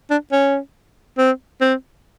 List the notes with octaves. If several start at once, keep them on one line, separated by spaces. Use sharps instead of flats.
D4
C#4
C4
C4